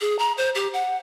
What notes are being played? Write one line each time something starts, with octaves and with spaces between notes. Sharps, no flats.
G#4
A#5
C5
G4
F#5